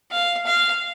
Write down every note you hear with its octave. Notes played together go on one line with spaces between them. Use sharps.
F5
F5